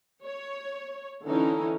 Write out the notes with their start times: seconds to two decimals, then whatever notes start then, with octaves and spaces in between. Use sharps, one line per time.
0.25 C#5
1.25 D3 E3 C#4 D#4 E4